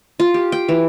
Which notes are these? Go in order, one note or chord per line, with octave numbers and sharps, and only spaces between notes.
F4
G4
G5
E3